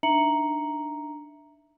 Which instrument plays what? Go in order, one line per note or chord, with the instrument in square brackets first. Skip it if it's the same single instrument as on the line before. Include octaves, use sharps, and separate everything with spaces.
[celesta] D4 D#4 E5 A#5 C#7 F#7